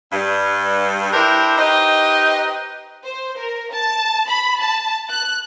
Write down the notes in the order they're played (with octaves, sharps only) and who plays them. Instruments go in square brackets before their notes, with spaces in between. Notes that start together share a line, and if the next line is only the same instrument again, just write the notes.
[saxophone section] G2
D4 E4 G4 A#4 C5
D#4 G4 B4 C5 D#5
[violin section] C5
A#4
A5
B5
A5
F#6